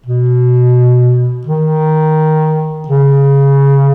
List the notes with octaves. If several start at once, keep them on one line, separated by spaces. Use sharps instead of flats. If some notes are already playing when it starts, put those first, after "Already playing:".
B2
D#3
C#3